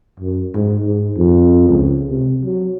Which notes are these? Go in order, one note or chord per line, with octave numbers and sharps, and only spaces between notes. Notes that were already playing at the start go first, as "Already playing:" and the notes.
F#2
G#2
G#2
F2
C#2
C3
F#3